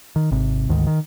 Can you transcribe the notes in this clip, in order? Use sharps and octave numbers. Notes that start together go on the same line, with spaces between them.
D#3
G#1 C3
G#1 D2 G#2 D#3
D#3